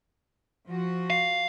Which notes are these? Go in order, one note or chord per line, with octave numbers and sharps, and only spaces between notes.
F3 F#4
F5